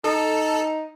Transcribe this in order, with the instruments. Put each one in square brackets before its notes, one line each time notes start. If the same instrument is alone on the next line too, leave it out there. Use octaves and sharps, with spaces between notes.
[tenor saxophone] D#4 [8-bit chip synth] A4